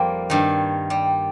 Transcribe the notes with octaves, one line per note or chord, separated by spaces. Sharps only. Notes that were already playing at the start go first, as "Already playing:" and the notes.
Already playing: F2 F3 G3 A#3 C4
G2 D#3
G3